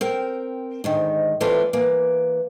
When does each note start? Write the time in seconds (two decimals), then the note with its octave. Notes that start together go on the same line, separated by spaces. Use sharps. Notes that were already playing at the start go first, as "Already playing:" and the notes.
0.01 C4 A#4 G5
0.84 D2 G#2 D#3
1.40 E3 A3 C4 E4 F4 D5
1.73 E3 A#3